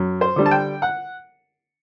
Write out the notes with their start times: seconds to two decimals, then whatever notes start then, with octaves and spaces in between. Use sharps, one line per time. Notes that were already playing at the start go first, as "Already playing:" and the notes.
Already playing: F#2
0.21 C5
0.36 D3 G3
0.46 A5
0.51 G5
0.82 F#5